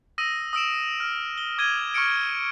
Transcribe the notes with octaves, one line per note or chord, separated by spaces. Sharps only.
D#6 E6 A#6 D#7
D#6 E6 D7 E7
F6
G7
D6 G#6 D#7 G7
C#6 F6 C#7 D7